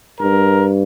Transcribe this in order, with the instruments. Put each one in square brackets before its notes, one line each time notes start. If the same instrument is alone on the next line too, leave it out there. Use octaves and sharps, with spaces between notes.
[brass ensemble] G2 A#4